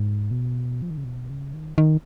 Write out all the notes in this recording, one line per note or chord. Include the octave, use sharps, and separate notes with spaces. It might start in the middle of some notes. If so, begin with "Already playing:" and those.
Already playing: G#2
B2
F3
D#3
C#3
B2
C#3
D#3
D#3